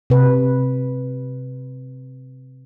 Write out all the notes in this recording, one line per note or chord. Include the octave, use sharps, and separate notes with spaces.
C3 B4